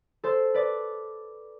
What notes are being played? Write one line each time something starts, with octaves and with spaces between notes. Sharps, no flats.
A4 C5
B4 D5